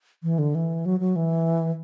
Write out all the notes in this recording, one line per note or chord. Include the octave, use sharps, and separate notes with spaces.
E3
D3
E3
F#3
F#3
E3